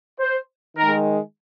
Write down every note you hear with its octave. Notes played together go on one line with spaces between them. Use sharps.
C5
D#3 G#3 A#4